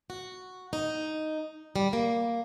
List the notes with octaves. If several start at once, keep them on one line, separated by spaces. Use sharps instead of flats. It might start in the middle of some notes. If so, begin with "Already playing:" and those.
F#4
D#4
G3
A#3